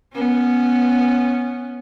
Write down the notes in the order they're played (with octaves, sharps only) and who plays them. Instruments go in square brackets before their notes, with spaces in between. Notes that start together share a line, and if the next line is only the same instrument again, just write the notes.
[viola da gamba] B3 C#4